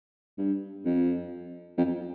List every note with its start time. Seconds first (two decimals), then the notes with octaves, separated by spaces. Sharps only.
0.38 G2
0.85 F2
1.78 F2